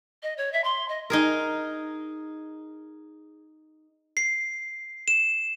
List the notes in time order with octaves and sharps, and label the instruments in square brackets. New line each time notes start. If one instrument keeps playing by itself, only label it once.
[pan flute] D#5
C#5
E5
C6
D#5
[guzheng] D#4 G#4 A#4
[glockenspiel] C7
E7